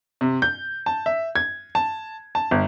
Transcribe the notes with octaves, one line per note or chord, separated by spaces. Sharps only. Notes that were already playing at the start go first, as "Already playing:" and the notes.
C3
G6
A5
E5
G#6
A5
A5
G1